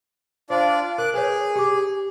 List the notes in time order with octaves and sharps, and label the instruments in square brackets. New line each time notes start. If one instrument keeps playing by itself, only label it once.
[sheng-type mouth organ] D4 F4 D5 [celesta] C5
[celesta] A#4 [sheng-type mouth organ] D6 F#6
[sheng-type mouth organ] G#4 [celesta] B4 C#5
[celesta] G4 D6